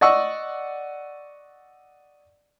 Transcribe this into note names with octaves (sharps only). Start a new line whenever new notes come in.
D5 D#5 F#5 C#6 E6